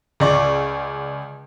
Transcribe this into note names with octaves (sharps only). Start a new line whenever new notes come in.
C#2 D5 C#6